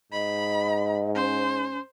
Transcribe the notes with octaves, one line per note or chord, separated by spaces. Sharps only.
G#2 D#5 B5
C#4 C5